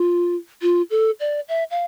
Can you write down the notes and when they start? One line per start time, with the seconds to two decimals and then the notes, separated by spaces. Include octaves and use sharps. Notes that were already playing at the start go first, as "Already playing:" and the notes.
Already playing: F4
0.62 F4
0.90 A4
1.20 D5
1.49 E5
1.71 F5